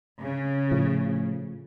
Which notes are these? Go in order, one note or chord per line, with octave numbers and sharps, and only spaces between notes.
C#3
A2 F3 A3